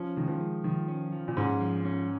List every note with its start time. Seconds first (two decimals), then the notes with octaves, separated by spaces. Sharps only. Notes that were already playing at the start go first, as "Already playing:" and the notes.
Already playing: F3 C#4
0.16 D#3 G#3
0.28 F3
0.40 G#3
0.64 D#3 F3
0.88 C#4
1.12 F3
1.28 A#2
1.37 G#2 C#4
1.61 F3
1.85 C#4